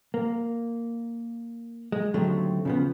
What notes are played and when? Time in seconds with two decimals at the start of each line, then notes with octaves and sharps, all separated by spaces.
0.14 A#3
1.92 G#3
2.14 D#2 D3 F#3 A3 C4
2.65 C#3 F3 B3